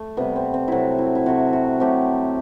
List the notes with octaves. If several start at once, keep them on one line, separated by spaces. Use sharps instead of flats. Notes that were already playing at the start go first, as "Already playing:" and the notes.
Already playing: A3
C3 G3 B3
C4
C4
C3 F#3 A3 E4 F#4
E4
E4
C3 F#3 A3 F#4
F#4
C3 F#3 A3 G4